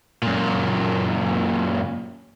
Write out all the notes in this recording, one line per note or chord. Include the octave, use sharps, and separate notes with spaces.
F#2 A#2